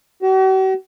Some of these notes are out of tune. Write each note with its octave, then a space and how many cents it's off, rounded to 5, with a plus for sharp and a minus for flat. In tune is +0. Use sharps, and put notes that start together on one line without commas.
F#4 +45